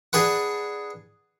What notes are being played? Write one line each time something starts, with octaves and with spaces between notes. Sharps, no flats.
D4 G#4 B4 F#5